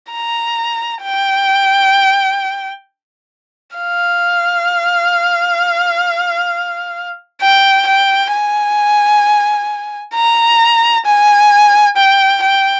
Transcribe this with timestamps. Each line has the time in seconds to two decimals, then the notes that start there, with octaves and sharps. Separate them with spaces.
0.12 A#5
1.04 G5
3.77 F5
7.42 G5
7.88 G5
8.32 G#5
10.15 A#5
11.06 G#5
11.97 G5
12.43 G5